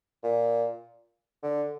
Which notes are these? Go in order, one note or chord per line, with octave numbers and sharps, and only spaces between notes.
A#2
D3